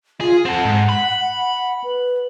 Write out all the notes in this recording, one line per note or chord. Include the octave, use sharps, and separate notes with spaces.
F4 G#4
C4 A4 F#5
G#2
B5
B4